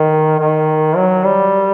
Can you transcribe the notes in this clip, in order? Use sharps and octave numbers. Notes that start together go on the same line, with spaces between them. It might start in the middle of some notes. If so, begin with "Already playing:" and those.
Already playing: D#3
D#3
F#3
G3